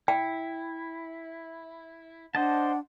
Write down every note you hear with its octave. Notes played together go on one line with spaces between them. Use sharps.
E4 G5
D4 C5 D#5 F#5 A5